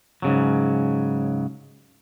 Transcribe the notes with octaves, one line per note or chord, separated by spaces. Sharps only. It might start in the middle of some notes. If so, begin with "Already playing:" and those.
G#2 C#3 F#3